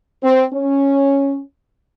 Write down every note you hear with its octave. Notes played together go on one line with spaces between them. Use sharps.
C4
C#4